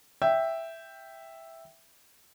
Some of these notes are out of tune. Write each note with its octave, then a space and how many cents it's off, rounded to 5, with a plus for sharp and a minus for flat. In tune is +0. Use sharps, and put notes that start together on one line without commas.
E5 +0 G5 +0